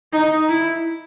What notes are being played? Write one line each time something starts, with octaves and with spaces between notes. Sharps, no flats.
D#4
E4